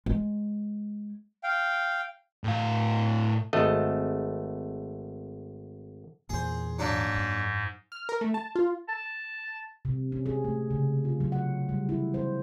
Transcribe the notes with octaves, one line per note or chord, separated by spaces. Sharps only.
G#3
F5 G5
A2 F5
G#1 A3 D#5
E2 A#2 G#4 C5
G#2 F#3 A#3 D4
F#2
F6
A#4
A3
A5
F4
A5
C3
C#4
G#4
A3
C#3
F4
F#3
F#5
G3
E4
C5